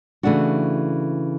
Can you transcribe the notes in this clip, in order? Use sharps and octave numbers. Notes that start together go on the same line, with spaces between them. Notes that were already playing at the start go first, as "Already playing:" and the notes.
C#3 E3 A3 D4 F#4